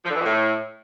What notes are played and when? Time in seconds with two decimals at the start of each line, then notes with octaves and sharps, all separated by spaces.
0.05 F3
0.10 D3
0.15 E3
0.21 F2
0.26 A2